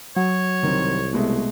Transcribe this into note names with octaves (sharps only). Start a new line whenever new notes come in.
F#3 C#5
C2 D#3 C4
B2 G#3 A3